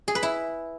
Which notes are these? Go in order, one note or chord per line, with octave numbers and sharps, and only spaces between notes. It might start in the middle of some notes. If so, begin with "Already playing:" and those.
G#4
B4
E4